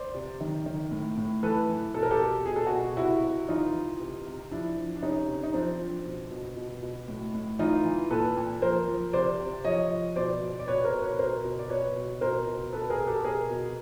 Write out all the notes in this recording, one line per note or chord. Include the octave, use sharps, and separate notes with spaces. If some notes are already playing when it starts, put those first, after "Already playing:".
Already playing: C5 D5
C3
D#3
D#3
A2
A2
E3 A4 B4
E3
B2 A4
A#4
G4 A4
B2
B2 G#4
A4
B2 F#4 G#4
C3 E4 F#4
C3
E3 D#4 F4
E3
C3
C3
F3 D4 E4
F3
D4
C3 C#4 D#4
C3
D#4
F3 C4 D4
F3
B2
B2
B2
B2
A2
A2
E3 D#4 F4
E3
A#2 A4 B4
A#2
F3 A#4 C5
F3
C3 C5 D5
C3
F3 C#5 D#5
F3
B2 C5 D5
B2
D5
B2 B4 C#5
A#4 C5
B2
B4 C#5
B2 A#4 C5
B2
D5
B2 B4 C#5
B2
B2 A#4 C5
B2
B2 A4 B4
G#4 A#4
B2
G4 A4
B2 G#4 A#4
B2